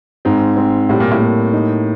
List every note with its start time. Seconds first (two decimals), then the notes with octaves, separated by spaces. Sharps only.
0.25 G#2 C4
0.57 C4
0.89 A2 G3
1.00 A#2
1.12 A2
1.20 A#3
1.53 D#4